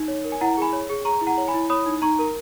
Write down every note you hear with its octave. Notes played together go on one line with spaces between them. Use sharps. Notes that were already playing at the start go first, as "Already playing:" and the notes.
Already playing: D#4
C#5
A#4
G#5
E4 F#5 A#5
G#4 G#5 B5
C#5
G#4
G#4 A#5 C#6
E4
F#5 A#5
C#5
G#5 B5
E4
C#5 B5 D#6
D#4
D#4 A#5 C#6
A#4